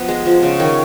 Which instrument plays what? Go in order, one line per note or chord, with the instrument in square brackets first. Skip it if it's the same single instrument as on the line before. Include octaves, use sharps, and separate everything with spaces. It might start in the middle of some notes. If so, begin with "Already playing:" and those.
Already playing: [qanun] F3 B3
G#3
F3
C#3
D#3 C#5